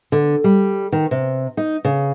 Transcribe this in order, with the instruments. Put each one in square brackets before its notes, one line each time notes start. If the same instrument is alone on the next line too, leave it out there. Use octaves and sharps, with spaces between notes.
[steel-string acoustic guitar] D3
G3
D#3
C3
D#4
C#3